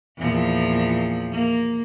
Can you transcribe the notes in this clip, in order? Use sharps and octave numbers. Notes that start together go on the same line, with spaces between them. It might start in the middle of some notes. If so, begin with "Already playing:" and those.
E2 A#2 F3
A#3